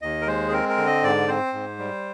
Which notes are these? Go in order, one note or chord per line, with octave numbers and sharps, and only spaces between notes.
D#2 D#5
A#4
G#3 C5
G#4
C4 A#4
A#4
D3
D#5
G#2 D5
C4 C5
G#2
G3